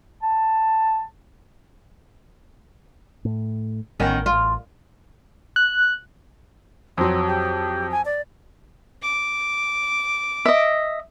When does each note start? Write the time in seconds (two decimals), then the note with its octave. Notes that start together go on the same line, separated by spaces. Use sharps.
0.22 A5
3.25 A2
4.00 A1 D#3 B3 C#4
4.26 F4
5.56 F#6
6.97 F2 F#3 C4
7.27 G4
7.91 G#5
8.05 D5
9.02 D6
10.45 D#5 E5